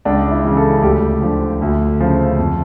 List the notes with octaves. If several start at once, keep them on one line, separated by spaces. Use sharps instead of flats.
C#2 D4
E4
C#3 E3
A4
D2 G4
D3 F3
D2
C#3 F3
F2